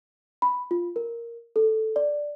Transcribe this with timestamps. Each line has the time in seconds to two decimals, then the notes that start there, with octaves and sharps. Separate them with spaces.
0.42 B5
0.71 F4
0.96 A#4
1.56 A4
1.96 D5